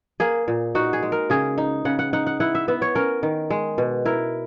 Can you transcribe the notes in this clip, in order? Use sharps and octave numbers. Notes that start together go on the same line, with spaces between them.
A#3 G#4
A#2
D#4 F#4
G#4
G#3
A#4
C#3 G#4
D#4
C#3 F#5
F#5
D#4 F#5
F#5
E4 F#5
E5
B3 E5
C#5
C#4 A#4
D#3
G#3
B2
E4 A#4